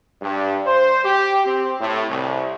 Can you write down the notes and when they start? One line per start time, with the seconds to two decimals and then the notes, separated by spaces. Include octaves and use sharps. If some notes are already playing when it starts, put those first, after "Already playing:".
0.22 G2
0.66 C5
1.04 G4
1.46 C4
1.80 A2
2.10 C2